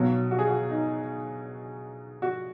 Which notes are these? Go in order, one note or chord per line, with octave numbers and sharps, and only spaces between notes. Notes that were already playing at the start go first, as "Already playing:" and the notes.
Already playing: B1 B2 F#3 F#4
F#4
G#4
F#4
D#4
F#4